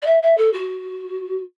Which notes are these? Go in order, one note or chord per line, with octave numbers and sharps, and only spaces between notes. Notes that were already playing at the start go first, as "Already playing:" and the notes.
D5
E5
E5
A4
F#4